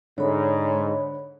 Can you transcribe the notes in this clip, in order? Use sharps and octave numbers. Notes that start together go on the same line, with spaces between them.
G#2 D3 C#5 B5